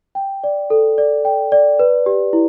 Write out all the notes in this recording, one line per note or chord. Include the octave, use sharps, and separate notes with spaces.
G5
D5
A4
D5
G5
D5
B4
G4
E4